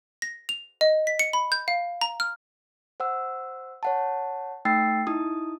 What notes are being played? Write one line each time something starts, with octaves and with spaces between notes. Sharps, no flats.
A#6
F7
D#5
B6
C#7
B5
G6
F5
A#5
F6
C5 F#5 E6
C#5 F#5 A5
A3 D#4 G5 E6 A6 C7
D#4 E4 D#6